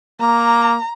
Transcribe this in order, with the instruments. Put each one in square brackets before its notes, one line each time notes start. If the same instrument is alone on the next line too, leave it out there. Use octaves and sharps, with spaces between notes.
[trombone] A#3 [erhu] A#5